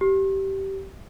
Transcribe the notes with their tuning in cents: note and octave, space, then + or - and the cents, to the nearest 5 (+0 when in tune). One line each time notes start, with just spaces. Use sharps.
G4 -20